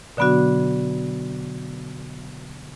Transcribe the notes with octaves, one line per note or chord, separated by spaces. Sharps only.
B2 D3 F#3 B3 D4 F#4